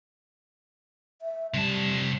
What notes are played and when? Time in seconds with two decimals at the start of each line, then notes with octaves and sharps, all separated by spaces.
1.22 E5
1.54 C3 G3 A5